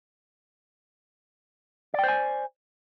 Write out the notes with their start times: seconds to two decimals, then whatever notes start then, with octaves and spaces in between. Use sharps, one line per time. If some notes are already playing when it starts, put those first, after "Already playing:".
1.94 D5
1.99 G5
2.04 C5
2.08 G#5